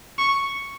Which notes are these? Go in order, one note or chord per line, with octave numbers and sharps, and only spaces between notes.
C#6